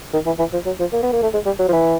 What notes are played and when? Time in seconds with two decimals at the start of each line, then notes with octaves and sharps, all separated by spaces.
0.13 D#3
0.26 E3
0.39 E3
0.53 F3
0.66 F#3
0.80 F3
0.93 A#3
1.03 B3
1.13 A#3
1.22 A3
1.33 G#3
1.46 G3
1.59 F#3
1.68 F3
1.72 E3